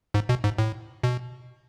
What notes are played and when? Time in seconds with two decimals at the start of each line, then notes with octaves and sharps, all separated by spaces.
0.14 G#2
0.29 B2
0.44 G#2
0.58 A2
1.04 B2